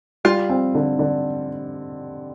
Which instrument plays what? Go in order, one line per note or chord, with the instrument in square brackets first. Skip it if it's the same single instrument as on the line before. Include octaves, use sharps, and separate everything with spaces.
[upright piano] G3 [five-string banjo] F4
[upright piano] C4
D3
D3